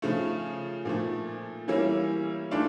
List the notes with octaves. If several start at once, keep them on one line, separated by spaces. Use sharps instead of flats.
C#3 F3 A3
A#2 F3 A3
E3 G3 A#3 C#4 E4
E3 A3 D4 F4